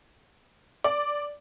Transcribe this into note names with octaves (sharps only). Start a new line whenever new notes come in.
D5